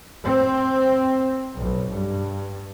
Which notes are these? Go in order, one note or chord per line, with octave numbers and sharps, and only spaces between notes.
C4
B1
G2